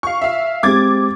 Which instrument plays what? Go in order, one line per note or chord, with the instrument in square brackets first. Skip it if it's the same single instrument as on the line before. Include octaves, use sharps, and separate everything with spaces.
[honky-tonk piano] F5 C#6
E5 F5
[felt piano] G#3 C4 G4 [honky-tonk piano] D6 G#6 A6